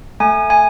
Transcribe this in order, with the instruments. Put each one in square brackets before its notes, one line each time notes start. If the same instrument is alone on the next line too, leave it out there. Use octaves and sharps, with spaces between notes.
[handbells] A3 G#5
G#5